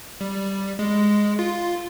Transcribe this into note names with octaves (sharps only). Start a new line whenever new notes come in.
G3
G#3
F4